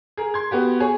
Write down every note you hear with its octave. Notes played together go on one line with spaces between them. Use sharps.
G#4 A#4
C6 G#6
B3 F#4 G4
G#4 C#5 G#5